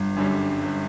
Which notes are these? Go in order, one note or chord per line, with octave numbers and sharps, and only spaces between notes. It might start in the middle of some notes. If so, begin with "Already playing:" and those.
Already playing: G1 G2
F#2 D3 G3 C#4
G1